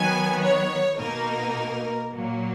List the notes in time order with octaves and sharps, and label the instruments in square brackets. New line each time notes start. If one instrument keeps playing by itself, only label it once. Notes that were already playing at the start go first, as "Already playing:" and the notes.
Already playing: [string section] D#3 F#3 B3 G#5
C#5
B2 A#3 D#4 A#4
A#2 F#3 A#3